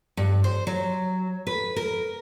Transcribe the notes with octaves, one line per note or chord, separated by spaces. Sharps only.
G2
C5
F#3
B4
A#4